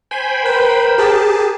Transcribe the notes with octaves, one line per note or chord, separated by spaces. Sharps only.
C5 G5 G#5 B5
A#4 B4
G4 G#4 A5